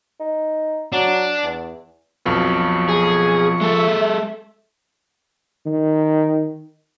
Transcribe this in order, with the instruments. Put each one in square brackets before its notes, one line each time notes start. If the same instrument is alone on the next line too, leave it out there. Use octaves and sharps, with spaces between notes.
[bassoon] D#4
[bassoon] F#3 [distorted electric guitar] D4
[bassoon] E2
[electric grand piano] B1 F2 B2 [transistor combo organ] F3 C#6
[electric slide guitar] G#4
[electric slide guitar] G#3 A4 [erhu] E5
[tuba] D#3